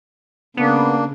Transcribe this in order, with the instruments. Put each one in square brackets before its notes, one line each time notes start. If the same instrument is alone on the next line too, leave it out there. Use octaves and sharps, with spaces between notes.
[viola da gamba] C#3 [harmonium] A#3 D4 [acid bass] B3